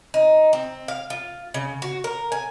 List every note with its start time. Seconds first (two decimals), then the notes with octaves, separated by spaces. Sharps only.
0.14 D#4
0.53 C4
0.88 F5
1.10 F4
1.54 C#3
1.82 F#4
2.04 A#4
2.32 G#5